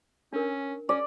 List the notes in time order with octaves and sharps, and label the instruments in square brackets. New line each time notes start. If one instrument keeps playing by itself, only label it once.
[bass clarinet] C#4 [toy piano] D4 A#4
[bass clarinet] C#4 [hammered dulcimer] D5